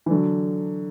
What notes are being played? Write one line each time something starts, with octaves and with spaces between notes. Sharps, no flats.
E3
D3 F#3